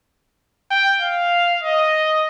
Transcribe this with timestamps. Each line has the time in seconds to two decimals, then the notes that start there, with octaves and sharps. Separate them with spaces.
0.71 G5
1.02 F5
1.64 D#5